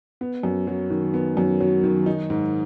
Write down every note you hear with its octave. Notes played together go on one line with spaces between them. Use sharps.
B3
F#2
F#3
D#3
B3
F#2
F#3
D#3
D#4
G#2